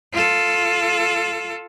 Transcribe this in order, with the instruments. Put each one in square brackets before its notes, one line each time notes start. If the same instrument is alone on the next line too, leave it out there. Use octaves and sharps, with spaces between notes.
[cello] F4 A4